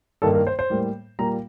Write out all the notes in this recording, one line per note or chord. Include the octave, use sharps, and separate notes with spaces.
G2 D#3 A#3 A4
A#4
C5
C5
A2 G3 A#3
A#2 G3 A#3 A#5